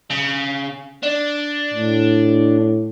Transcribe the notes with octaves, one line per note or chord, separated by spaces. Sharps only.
C#3
D4
A2